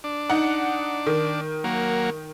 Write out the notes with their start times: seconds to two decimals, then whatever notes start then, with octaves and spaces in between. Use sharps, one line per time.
0.04 D4
0.30 D#4 F#5
1.07 D#3
1.64 F#3 A#3